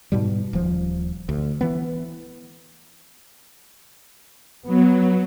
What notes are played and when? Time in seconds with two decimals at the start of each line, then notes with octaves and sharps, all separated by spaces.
0.12 G#2 B2 G3
0.53 D#1 F3
1.29 D2
1.61 E3 B3
4.67 F#3 B3